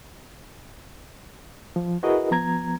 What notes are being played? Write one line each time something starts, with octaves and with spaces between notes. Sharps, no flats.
F3
E4 F#4 G#4 A#4 B4 D#5
F3 B3 A#5 G#6